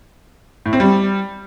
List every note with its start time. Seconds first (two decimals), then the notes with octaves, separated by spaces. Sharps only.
0.66 A2
0.73 C4
0.80 G3